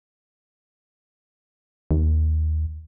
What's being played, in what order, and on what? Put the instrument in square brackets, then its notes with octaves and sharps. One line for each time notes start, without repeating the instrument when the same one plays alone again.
[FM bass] D#2